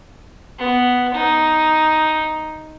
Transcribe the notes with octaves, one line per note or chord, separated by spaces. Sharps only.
B3
D#4